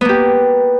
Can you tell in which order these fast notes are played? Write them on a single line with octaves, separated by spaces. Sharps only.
B3 A#3 G4